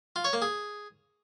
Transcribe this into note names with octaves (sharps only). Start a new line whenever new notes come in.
F4
C#5
A#3
G#4